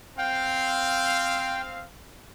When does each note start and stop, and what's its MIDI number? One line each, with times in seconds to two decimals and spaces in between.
0.18 1.84 60
0.18 1.84 77
0.18 1.61 79